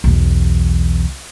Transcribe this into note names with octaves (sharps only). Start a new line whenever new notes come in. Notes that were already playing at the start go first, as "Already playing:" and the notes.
B1 E2